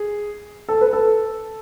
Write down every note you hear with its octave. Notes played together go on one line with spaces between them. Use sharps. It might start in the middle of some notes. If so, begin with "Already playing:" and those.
Already playing: G#4
A4
B4
A4